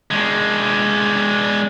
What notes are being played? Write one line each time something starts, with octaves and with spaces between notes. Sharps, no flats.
G#3 D4